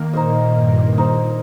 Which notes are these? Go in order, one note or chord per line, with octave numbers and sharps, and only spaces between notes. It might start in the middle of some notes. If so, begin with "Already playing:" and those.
Already playing: D#3 A#3
A#2 D#4 C5 D#5
G2
A#2 D#4 C5 D#5